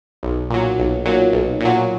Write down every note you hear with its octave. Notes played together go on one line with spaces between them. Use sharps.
B1
A#2 F#3
B1
A#2 F#3
B1
A#2
F#3